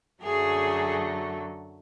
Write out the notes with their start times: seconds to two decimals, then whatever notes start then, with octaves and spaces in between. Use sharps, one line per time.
0.22 F#2 D3 F#3 A3 G#4